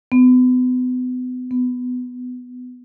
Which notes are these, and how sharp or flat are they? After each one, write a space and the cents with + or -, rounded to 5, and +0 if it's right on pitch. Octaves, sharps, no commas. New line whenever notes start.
B3 +35
B3 +15